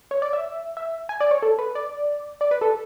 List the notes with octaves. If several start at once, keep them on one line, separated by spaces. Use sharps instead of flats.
C#5
D5
E5
E5
G#5
D5
C#5
A4
B4
D5
D5
B4
A4